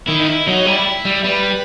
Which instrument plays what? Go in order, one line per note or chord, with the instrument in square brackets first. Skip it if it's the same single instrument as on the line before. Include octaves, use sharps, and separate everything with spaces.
[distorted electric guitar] D#3 [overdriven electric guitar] E4
[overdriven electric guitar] D#4
E4
[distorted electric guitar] F#3 [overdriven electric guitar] D#4
[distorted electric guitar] G3 [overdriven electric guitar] E4
[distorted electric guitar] G3
[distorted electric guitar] G3 [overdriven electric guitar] B4